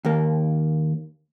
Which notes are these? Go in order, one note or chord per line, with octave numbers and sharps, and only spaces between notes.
D#2 A#3